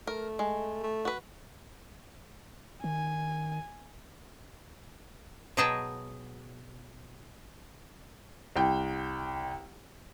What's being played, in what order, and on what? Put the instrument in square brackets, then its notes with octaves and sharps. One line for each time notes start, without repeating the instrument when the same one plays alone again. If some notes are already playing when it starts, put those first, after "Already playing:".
[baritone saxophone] A3 [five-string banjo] A#4
[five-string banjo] G#3
[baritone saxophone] A3
[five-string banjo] F#4 B4
[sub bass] D#3 [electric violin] G#5
[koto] B2 F#3 G#4 D#5 G5 A5
[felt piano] C2 G5